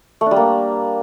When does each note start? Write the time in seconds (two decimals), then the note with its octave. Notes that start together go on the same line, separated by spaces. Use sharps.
0.21 A3
0.26 D4
0.31 G3
0.36 A#3